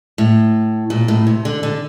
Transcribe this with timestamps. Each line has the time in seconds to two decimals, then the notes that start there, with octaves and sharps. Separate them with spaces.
0.18 A2
0.90 A#2
1.08 A2
1.27 C3
1.45 D3
1.63 D3